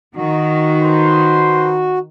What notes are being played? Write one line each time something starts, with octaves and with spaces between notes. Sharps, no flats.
D#3 F#4
B4 C5 C6